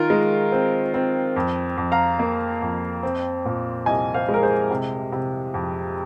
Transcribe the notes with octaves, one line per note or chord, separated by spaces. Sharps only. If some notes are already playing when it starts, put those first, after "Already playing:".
Already playing: D#3 F4 A#4
G#3
C4
C4
F2
F2
F5 A#5
A#3
F2
C4
A#2
C2 D#5 G#5
C5 F5
G#3
A#4
G#4 C5
C3
C3
F2